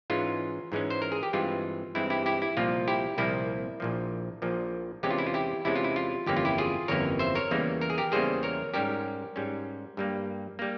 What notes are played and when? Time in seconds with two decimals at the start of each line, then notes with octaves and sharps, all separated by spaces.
0.10 G#2 E3 G#3 C#4 F4
0.72 G#2 E3 G#3 C#4
0.90 C5
1.02 A#4
1.12 G#4
1.23 G4
1.33 G2 E3 G#3 C4 F4
1.95 G2 E3 G#3 C4 E4
2.10 E4 G4
2.26 E4 G4
2.42 E4
2.57 C2 A#2 F3 A#3 F4
2.88 E4 G4
3.18 C2 A#2 F3 A#3 E4
3.80 A#1 A#2 F3
4.42 A#1 A#2 F3
5.03 E2 C3 E3 G#3 C#4 G4
5.11 F4
5.18 E4
5.27 F4
5.34 E4 G4
5.65 E2 C3 E3 G#3 C#4 E4
5.76 F4
5.84 E4
5.96 F4
6.27 G1 F2 E3 A#3 C#4 G4
6.37 F4
6.45 E4 G4
6.58 F4 G#4
6.88 G1 F2 E3 A#3 C#4 A#4 C#5
7.19 C5 E5
7.35 A#4 C#5
7.51 E2 C#3 E3 G3 A#3
7.81 A#4
7.90 G#4
7.98 G4 A#4
8.12 E2 C#3 E3 G3 A#3 G#4 C5
8.43 A#4 C#5
8.74 G#2 G3 C#4 G4 A#4
9.36 G#2 G3 C#4
9.97 G2 G3 A#3
10.59 G3 A#3